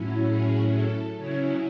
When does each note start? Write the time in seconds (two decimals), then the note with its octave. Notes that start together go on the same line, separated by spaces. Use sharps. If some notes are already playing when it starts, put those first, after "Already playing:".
Already playing: A2 F#3 C#4 E4
0.26 G#4
0.72 A4
1.17 C#3 F#3 C#4 E4 C#5